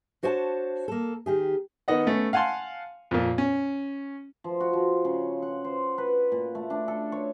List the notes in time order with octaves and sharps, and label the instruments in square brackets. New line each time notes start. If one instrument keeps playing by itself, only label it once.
[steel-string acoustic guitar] D4 F#4 C5 C#5 G#5 A5
A#3 A4
D#3 G4 G#4
[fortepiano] D#3 B3 D#5 F#5
A3 B3 C#4
F5 F#5 G#5 A5 C6
F2 A#2
C#4
[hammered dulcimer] F3
F#4
F3
C#3
F#5
C5
B4
A#2
A3
D4
A4
C#5